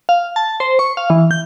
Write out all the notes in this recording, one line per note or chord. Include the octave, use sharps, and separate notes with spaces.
F5
A5
C5
C#6
F5
E3
G6